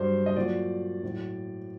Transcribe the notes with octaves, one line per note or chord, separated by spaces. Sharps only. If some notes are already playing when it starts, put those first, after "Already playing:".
Already playing: G2 F#3 C5
D#5
A#2 F#3 D5
A2 F#3